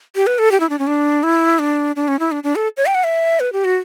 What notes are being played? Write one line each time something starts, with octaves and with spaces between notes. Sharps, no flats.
G4
B4
A4
G4
E4
D4
C#4
D4
E4
D4
D4
C#4
E4
D4
D4
A4
C#5
G5
F#5
E5
B4
G4
F#4